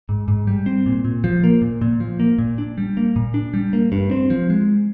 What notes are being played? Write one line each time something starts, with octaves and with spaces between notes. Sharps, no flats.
G#2
G#2
G3
C4
A#2
A#2
F3
A#3
A#2
A#2
F3
A#3
A#2
D4
G3
A#3
A#2
D4
G3
A#3
G2
C4
F3
G#3